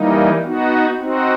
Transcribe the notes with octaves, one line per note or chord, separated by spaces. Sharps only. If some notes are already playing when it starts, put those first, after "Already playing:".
Already playing: E3 G3 A#3 D#4
B3 D#4 F#4
C4 D#4 F#4